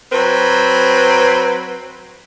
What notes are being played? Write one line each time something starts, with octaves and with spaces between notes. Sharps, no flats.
F#3 C4 B4